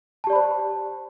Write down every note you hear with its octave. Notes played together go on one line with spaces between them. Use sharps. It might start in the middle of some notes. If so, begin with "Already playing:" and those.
G4 C5 D5 A5 B5